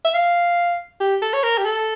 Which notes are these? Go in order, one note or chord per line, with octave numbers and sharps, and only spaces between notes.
E5
F5
G4
A4
C#5
A#4
G4
A4